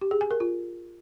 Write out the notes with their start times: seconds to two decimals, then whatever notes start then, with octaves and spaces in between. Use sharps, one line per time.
0.01 G4
0.11 G#4
0.21 G#5
0.31 A#4
0.40 F4